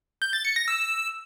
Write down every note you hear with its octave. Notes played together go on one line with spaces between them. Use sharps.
G6
A6
C#7
A#6
E6